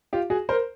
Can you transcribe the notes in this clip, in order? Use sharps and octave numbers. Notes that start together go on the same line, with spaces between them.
F4 G4
F#4 G#4
A#4 C5